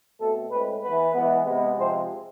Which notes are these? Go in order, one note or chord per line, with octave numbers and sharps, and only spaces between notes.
B2 A3 C4 A4
A2 G#3 C4 B4
E3 B3 B4
E3 G#3 B3
C3 G#3 B3
C3 F3 G#3 C4 C5